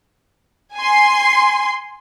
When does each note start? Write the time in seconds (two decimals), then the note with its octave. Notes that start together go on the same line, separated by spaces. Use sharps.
0.76 G#5 C6